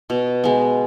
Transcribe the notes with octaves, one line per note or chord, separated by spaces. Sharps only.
B2
G#3 B3